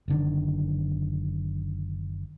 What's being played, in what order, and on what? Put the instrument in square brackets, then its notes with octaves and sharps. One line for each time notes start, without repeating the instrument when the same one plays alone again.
[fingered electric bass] F#1 D3 D#3